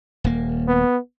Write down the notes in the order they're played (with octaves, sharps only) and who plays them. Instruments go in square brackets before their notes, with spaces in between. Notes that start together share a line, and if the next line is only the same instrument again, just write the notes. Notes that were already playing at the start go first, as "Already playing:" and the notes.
[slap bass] D#1 A#3
[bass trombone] B3